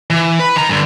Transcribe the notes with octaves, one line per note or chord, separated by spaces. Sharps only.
E3
B4
D#3 A#5
G2 D3